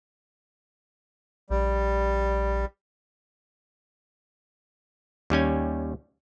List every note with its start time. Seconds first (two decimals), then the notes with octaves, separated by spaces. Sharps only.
1.50 A#1 G3
5.30 D#2 G3 C#4 G#5